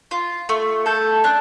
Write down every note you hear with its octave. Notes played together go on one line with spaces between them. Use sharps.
F4
A3
A4 G6
D4 F#6